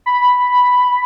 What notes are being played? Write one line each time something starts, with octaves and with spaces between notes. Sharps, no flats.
B5